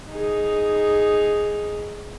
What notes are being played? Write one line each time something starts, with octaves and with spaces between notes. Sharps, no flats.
D#4 G#4